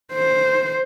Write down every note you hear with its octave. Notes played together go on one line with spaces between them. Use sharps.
C5